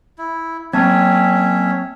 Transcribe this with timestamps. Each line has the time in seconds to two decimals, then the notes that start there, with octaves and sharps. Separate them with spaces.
0.18 E4
0.73 F#3 A#3 C4 C#4 C#5 E5 A5 G#6